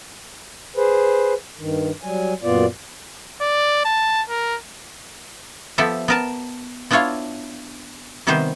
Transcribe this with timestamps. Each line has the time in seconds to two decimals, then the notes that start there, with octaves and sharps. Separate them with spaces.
0.76 G#4 B4 C5
1.59 G2 D#3
2.03 F#3 G3 G#5
2.43 F#2 A#2 B3 F4 D5
3.41 D5
3.85 A5
4.29 A#4
5.78 F3 B3 G4 A4 E5
6.08 B3 A#4 A5
6.91 B3 D4 E4 F4 C#5 F5
8.27 C3 D#3 G3 B3 C5